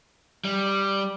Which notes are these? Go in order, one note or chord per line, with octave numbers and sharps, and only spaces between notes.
G3